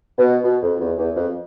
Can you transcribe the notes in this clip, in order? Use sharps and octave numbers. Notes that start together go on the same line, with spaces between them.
B2
B2
F2
E2
E2
F2